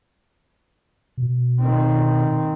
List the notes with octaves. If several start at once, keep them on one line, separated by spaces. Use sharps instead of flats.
B2
D#3 C4